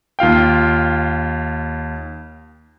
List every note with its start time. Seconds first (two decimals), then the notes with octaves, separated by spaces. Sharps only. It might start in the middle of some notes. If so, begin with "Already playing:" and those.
0.19 D#2 F4 F5 G5